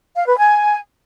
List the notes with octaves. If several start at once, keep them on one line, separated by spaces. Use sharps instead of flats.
F5
B4
G#5